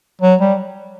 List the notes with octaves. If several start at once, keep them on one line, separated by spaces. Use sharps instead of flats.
F#3
G3